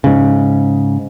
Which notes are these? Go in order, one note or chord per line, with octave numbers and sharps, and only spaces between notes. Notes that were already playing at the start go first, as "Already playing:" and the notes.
G#2 C#3